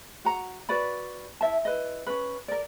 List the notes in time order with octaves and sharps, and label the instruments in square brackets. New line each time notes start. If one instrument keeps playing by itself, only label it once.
[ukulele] F#4 F#5 A#5
F#4 B4 D5 B5
E4 E5 A5
E4 B4 D#5
C#4 D4 B4
A#4 D5